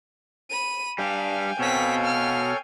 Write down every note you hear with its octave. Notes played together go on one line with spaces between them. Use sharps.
B5 D#7
G3 D4 F5 G5 G#5
B2 C4 A4 C#5 F5 B6
F6